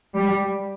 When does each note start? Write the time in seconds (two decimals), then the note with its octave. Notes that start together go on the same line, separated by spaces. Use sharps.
0.15 G3